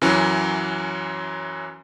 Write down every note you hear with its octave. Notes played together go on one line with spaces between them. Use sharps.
F#2 E3 F#3 C#4